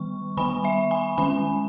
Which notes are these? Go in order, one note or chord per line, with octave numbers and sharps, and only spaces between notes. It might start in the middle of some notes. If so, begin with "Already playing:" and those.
Already playing: D#3 G3 B3 C#6
D#3 G3 B3 G#5 B5
E5 G#5
G#5 B5
D#3 G#3 C#4 G#5 B5